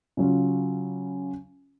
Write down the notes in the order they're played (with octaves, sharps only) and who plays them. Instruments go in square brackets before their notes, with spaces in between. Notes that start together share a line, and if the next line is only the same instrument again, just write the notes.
[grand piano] C#3 F#3 C#4 F4